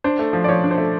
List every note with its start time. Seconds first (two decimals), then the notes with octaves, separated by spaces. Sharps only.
0.04 D4 C5
0.19 A3
0.33 F3
0.44 D5
0.48 F3 C#5
0.64 D4
0.71 C5
0.77 A3